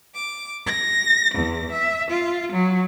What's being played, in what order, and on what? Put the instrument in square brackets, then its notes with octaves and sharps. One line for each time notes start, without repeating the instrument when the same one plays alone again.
[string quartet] D6
A#6
E2
E5
F4
F#3